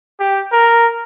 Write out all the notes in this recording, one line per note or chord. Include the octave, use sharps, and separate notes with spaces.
G4
A#4